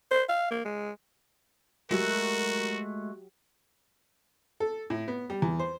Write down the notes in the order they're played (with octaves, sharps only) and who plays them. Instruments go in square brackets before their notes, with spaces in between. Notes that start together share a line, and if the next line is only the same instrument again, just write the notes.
[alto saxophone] C5
F5
A#3
G#3
[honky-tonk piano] F#3 G4 [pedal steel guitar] G#3 A3 F#5 [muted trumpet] F#4 [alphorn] A#4
[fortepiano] A4
A2
B3
G3
E2
C5